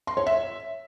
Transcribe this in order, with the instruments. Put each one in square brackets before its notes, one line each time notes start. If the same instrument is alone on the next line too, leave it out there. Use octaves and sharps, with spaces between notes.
[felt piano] C6
C#5
E5